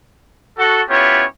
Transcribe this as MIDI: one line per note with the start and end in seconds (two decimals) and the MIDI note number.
0.58 0.81 66
0.58 0.81 69
0.89 1.24 59
0.89 1.24 61
0.89 1.24 64
0.89 1.24 65
0.89 1.24 67
0.89 1.24 73